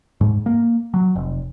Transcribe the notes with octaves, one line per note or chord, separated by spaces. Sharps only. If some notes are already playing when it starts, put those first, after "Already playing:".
G#2
A#3
F#3
F1